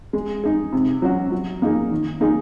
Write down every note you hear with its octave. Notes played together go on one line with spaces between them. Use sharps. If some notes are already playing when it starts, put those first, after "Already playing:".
G#3
D#4 G#4
C3
F#3 C#4 F#4
F#3
A#3 D#4 G#4
D#3
A#3 D#4 G#4